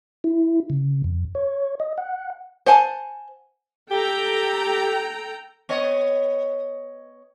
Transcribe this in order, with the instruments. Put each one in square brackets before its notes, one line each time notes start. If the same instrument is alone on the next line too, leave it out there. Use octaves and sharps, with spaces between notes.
[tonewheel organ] E4
C#3
F2
C#5
D#5
F#5
[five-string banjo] C5 F#5 G#5 A5
[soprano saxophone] G4 [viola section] A4 G5 A#5
[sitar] B3 C#5 D#5